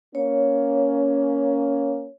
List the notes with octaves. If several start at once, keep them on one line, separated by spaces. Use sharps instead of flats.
A#3 C#4 C#5